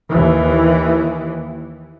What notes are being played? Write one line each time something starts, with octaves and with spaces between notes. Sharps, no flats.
D#2 E3